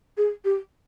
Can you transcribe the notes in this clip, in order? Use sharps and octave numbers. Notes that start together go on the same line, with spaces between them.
G#4
G4